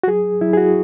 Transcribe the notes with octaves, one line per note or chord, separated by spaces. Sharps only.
F#4
F#3 G#4
F#3 E4
G#4
F#4